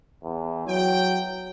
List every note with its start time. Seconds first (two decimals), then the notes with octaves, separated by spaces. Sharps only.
0.23 E2
0.68 F#3 G5